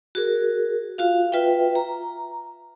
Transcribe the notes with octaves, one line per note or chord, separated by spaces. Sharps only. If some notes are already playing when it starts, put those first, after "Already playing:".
F#4 G#4 A#4
F4 F#4 F5
F4 B4 E5 G5
A#5